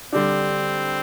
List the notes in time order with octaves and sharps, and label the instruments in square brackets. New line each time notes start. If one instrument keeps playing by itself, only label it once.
[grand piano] D3 G3 D4 [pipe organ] C4